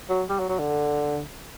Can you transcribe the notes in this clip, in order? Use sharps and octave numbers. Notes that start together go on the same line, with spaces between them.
F#3
G3
F#3
F#3
D3